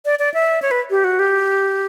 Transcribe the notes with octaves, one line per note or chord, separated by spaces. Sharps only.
D5
D5
E5
C#5
B4
G4
F#4
G4